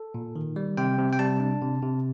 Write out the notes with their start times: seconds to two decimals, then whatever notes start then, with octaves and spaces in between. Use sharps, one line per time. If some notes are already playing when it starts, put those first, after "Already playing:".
Already playing: A4
0.14 A#2
0.36 D#3
0.56 G3
0.77 C3 G5
0.99 C3
1.13 G5
1.19 G3 A5
1.40 D4
1.61 C3
1.82 C3